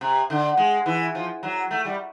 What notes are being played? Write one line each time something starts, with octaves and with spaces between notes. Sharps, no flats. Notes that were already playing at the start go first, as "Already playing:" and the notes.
C3
D3
G#3
E3
F3
F#3
A3
G3